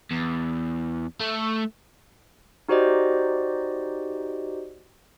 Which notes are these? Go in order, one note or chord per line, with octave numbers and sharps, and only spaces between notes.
E2
A3
D#4 F#4 G4 C5 D5 D#5